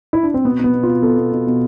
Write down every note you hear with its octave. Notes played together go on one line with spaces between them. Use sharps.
E4
D4
C4
B2 B3
B2 B3
B2
F4
B2
B2 A4
B2
B2
B2